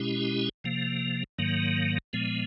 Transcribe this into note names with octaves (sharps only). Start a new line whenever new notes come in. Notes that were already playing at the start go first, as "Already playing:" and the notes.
Already playing: B2 G#3 C#4 E4 G4
C3 F3 A#3
G#2 D#3 F#3 A#3
A#2 F3 G#3 B3